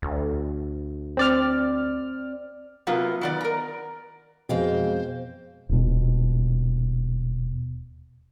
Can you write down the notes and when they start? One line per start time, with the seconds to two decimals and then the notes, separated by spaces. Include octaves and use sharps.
0.02 D2
1.17 C4 D5 F6
2.87 C3 F#3 A#3 B3 F4
3.21 D#3 B3 D5
3.41 A#4 A#5
4.49 F2 B2 G#3 C5 F5 G5
5.69 D#1 B2